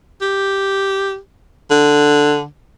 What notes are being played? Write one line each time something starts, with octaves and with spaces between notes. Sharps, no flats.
G4
D3